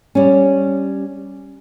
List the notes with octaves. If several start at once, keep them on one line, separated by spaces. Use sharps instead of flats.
G3 C#4